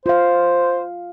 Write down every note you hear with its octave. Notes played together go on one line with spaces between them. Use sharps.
F4 C5 F5